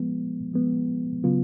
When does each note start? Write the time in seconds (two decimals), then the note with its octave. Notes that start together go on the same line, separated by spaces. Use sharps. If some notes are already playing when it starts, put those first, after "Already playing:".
Already playing: F3 G#3 B3
0.54 F3 G#3 B3
1.24 C#3 F#3 B3 F4